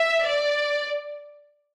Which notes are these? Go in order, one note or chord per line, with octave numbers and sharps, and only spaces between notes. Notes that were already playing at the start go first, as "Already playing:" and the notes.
Already playing: E5
D5